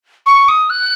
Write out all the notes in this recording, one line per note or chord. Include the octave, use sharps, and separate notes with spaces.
C#6
D#6
F#6